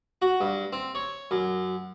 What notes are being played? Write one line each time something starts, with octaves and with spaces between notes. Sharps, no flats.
F#4
G2
C4
C#5
F#2